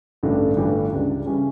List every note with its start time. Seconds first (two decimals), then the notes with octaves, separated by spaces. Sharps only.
0.23 A1 G2 D3 A3 D4
0.57 G1 G2 E3 A3 D4
0.91 C#2 C#3 G3 D4
1.26 C#3 E3 G3 C#4